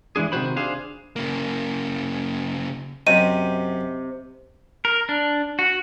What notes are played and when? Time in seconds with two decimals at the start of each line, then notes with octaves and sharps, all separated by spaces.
0.16 E3 G#3 D4 G#4
0.32 C3 D#3 F#3 F#4 C5 B5
0.57 D4 G#4 C5 F5
1.16 C#3 A#3
3.07 F#2 C3 D#5 D#7
4.85 A#4
5.09 D4
5.59 F#4